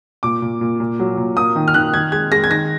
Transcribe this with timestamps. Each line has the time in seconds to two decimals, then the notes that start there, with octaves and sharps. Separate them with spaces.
0.23 A#2 D6
0.42 A#2
0.61 A#2
0.80 A#2
0.99 F#3
1.17 A#2
1.36 A#3 D#6
1.56 D#3
1.68 F6
1.74 D#3 F#6
1.94 D#3 G#6
2.12 G#3 G#6
2.32 G#3 A#6
2.44 G#6
2.50 D#3 A#6